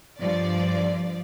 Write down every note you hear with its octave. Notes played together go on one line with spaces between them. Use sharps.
G2 F3 D5